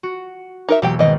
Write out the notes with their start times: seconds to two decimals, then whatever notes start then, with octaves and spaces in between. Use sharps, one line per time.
0.03 F#4
0.69 D#4 A#4 E5
0.82 E1 F#3 A#3 G4 G5
0.99 G#1 D#3 B3 D#5